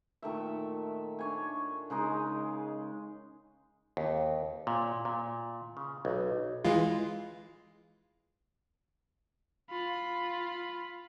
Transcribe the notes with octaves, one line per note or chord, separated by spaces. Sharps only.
A#2 D#3 A3 E5
D4 C#5 G#5
C#3 G#3 D#4 D#5
D#2
A#2
A#2
C#3
B1
E3 G#3 F4
F4 B5